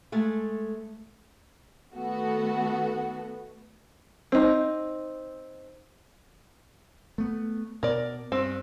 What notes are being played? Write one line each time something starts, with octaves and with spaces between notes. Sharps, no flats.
G#3 A3
D#3 A3 B3 F#4 A4
C4 D#4
A3 B3
B2 A#4 D5
G2 C4